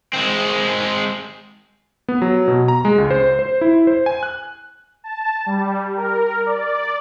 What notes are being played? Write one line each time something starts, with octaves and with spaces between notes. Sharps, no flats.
G#3 C4
B3
F#3
B2
A#5
G#3
C#2
C5
C5
E4
C5
G#5
F#6
A5
G3
A#4
D5